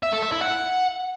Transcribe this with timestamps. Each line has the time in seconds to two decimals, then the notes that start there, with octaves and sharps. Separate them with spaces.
0.03 E5
0.13 A4
0.22 E5
0.32 E4
0.42 F#5